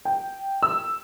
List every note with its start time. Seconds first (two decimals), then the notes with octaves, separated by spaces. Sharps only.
0.05 G5
0.63 E6